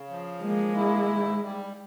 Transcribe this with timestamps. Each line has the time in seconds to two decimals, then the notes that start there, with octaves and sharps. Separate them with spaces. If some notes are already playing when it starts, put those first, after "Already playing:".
Already playing: C#3
0.10 F3
0.43 G#3 A#3
0.76 E4
1.08 G#2
1.42 G3